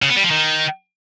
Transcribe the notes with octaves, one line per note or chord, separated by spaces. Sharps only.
C#3
B3
G3
F3
D#3